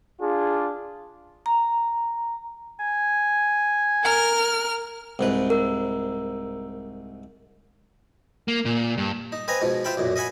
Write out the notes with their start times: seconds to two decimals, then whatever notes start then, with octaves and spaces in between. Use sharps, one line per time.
0.21 D4 F4 G#4
1.46 A#5
2.80 G#5
4.03 A#4 F6
5.19 C2 G#2 B4
5.50 A#4
8.48 A#3
8.65 A#2
8.98 G2
9.32 D#4
9.48 C4 B4 D#5 G#5 A#5
9.62 G#2 B2 F3
9.84 F4 C5 E5 F5 G5 B5
9.97 B1 F#2 A#2
10.16 D#5 E5 F#5 G#5 B5